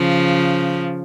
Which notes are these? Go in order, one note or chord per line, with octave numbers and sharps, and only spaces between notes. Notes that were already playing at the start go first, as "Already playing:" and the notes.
Already playing: C#3 F3